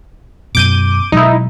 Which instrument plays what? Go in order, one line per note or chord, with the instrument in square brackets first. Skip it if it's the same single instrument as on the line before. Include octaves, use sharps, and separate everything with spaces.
[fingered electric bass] F#2 B2 [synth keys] D6 G6 D#7
[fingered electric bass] B2 F#3 G#3 [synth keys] D#4 E4